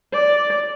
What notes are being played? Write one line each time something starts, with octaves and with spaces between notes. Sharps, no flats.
D5